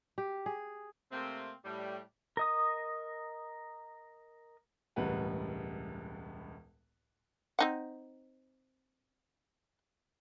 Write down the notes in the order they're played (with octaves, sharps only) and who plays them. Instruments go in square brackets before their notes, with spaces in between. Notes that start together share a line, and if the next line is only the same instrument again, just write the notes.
[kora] G4
G#4
[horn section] C3 A3 A#3 C4
A2 G3
[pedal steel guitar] A#4 D#5 D#6
[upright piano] E1 C#2 A2 G3 B4 F#5
[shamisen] C4 D#4 F#5